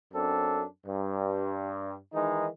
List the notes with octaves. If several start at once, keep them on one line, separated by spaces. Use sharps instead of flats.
F#2 C4 D4 A4
G2
D#3 E3 G#3 D#4